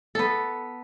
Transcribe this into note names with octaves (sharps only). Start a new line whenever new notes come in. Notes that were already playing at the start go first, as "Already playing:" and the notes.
B3 A4